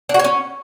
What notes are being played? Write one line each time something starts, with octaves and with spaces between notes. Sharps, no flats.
D4
F#4
C#5
C#4